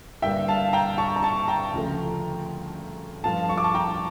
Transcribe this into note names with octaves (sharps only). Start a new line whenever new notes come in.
G2 D3 G3 A#3 E5 G5
F5 A5
G5 A#5
A5 C#6
A#5
A5 C#6
G5 A#5
D2 C#3 F3 A3
G2 F3 A3 F5 A5
C#6
D6
A5 C#6
G5 A#5